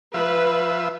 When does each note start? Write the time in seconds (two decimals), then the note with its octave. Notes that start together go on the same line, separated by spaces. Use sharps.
0.14 F3 B4 E5